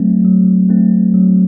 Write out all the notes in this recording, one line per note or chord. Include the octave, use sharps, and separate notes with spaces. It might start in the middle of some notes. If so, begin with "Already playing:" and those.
Already playing: F#3 A3 C4
F#3
A3 C4
F#3